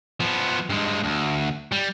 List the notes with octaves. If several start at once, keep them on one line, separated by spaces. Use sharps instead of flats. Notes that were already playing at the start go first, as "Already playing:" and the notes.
F3 B3
G2 G#3
D2
G3